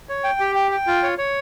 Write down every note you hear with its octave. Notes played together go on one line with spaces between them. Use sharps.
C#5
G5
G4
G5
G5
F4
C#5
C#5